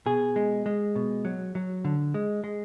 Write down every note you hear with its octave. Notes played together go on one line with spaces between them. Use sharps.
B2 G#4
G#3
G#3
B2
F#3
F#3
D3
G#3
G#3